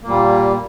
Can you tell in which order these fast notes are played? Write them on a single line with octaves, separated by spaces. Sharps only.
A#3 A#2 G3